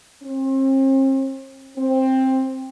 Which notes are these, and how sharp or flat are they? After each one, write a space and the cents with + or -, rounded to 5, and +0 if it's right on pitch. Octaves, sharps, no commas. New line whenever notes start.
C4 +40
C4 +10